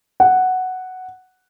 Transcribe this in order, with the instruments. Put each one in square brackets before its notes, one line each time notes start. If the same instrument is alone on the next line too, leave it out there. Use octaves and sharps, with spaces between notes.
[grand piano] F#5